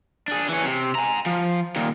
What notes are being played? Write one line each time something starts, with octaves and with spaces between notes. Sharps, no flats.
D4 G#4
E3 C#4
C3
G#5 A#5
F3
A#2 D#3